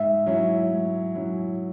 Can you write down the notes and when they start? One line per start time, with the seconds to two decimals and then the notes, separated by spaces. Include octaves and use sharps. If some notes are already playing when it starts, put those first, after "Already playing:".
Already playing: G#2 E5
0.26 F#3 C#4 E4
0.71 G#2
1.15 F#3 C#4 E4